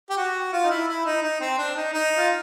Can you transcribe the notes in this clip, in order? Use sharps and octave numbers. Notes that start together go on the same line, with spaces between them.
G4
F#4
F4
D#4
E4
E4
D#4
D#4
C4
D4
D#4
D#4
F4